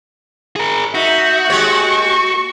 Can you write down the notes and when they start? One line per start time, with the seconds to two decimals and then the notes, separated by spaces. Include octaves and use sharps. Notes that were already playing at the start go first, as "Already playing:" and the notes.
0.56 G#4 A#4
0.95 D#4 F#4 E5
1.50 G#3 G4 C#5 C#6